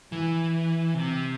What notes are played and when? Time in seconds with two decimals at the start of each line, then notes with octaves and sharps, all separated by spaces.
0.12 E3
0.94 C3